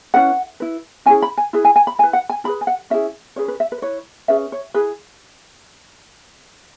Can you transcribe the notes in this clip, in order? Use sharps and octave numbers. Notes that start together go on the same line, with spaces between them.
C#4 E4 B4 F#5
E4 B4
C#4 E4 G#4 G#5
B5
G#5
E4 G#4 B4
G#5
G#5
B5
E4 B4 G#5
F#5
G#5
E4 G#4 B4 B5
G#5
F#5
C#4 E4 G#4 E5
C#4 G#4 B4 C#5
B4
E5
B4
E4 B4 C#5
C#4 G#4 B4 E5
C#5
E4 G#4 B4